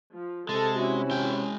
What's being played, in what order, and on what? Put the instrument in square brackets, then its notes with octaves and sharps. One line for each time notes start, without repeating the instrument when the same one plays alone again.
[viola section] F3
[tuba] C3 [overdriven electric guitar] G#3 [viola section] A4 A5
[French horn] C#4 [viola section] E4 F#4
[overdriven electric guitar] G#3 G5